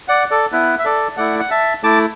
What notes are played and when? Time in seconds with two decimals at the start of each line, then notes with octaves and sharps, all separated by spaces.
0.08 D5 F#5
0.30 A4 D5
0.52 B3 E4 B4
0.79 E5
0.85 A4 D5
1.17 A3 E4 D5 F#5
1.39 F#5
1.51 E5 A5
1.83 A3 E4 A5 D6